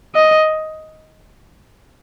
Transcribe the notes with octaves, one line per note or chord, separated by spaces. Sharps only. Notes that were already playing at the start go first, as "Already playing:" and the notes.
D#5